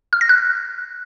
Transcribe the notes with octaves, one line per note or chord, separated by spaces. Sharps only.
F6
A#6
F#6